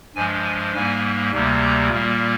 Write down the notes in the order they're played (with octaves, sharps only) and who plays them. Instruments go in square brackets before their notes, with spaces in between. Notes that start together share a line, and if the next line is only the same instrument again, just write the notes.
[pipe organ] G2 F3 G#3 G#5
G#5
G#2 G3 A#3 G#5
D2 C3 G3 A#3
A#5
A#2 G3 A#3